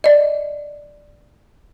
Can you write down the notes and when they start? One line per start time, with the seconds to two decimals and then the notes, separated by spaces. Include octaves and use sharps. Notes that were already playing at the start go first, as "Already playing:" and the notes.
0.04 D5 D#5